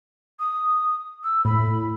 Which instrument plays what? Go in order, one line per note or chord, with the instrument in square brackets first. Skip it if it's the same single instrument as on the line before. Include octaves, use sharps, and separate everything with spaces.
[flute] D#6
E6
[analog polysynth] A2 [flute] B5